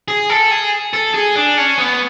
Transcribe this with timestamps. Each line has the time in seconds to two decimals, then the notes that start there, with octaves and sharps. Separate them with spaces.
0.08 G#4
0.30 A4
0.51 G#4
0.93 A4
1.14 G#4
1.36 D4
1.58 C#4
1.78 B3